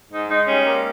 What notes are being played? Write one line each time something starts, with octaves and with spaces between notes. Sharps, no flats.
G#2 D#4
G#3 D#4
G3 C#4
A#3